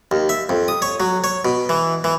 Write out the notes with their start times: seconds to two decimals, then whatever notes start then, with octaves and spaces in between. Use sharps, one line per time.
0.11 D#2
0.29 E5
0.49 F2
0.68 D#6
0.82 C#5
1.00 F#3
1.24 C#5
1.45 B2
1.69 E3
2.04 E3